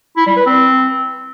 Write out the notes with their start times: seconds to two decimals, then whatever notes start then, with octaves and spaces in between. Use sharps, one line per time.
0.17 E4
0.26 G3
0.36 B4
0.46 C4